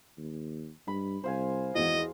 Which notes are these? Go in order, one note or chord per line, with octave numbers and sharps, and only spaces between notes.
D#2
G2 B5
C2 C5 F5 G#5
G#1 E2 E3 F#4 D#5